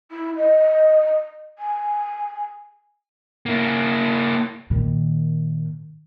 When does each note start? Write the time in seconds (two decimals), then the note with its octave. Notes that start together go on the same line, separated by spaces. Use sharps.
0.11 E4
0.37 D#5
1.59 G#5
3.46 A#3 E4
4.70 A#2 D#3